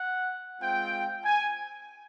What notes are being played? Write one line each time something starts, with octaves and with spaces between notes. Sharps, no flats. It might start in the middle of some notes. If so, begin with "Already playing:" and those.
Already playing: F#5
G#3 C4 F4 G5
G#5